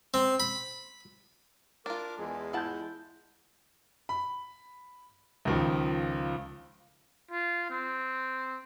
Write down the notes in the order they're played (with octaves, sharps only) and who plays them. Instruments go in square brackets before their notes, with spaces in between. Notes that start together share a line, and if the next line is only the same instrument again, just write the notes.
[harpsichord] C4
B5
[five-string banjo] D4 F4 [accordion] A#4 D6
[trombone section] E2 G#4 [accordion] G#3
[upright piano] E4 G6 [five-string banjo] F4 F#5 A5
[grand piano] B5
C#2 D#3 F3
[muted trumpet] F4
C4